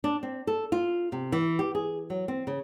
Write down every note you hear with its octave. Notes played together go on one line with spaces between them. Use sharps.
D4
C4
A4
F4
C3
E3
G4
G#4
F#3
C4
C#3